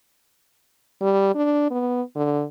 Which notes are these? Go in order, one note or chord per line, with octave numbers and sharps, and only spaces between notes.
G3
D4
B3
D3